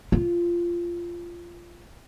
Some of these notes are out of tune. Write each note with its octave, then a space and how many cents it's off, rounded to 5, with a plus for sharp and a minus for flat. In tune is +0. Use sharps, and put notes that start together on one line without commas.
F4 -15